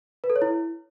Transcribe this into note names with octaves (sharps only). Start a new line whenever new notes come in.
B4
A4
C#5
E4